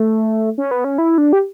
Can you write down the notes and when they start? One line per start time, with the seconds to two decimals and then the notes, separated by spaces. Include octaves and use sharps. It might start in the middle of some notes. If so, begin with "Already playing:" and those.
Already playing: A3
0.58 C#4
0.71 B3
0.84 C#4
0.98 E4
1.18 D4
1.33 G4